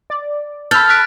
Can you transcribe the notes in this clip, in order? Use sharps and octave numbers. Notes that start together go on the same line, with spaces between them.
D5
A4 B5 E6 F6 G6 A6
F#6 B6 D7